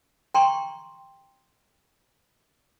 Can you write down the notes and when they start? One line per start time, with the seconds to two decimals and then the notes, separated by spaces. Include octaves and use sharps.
0.34 G5 A#5 C6 C#6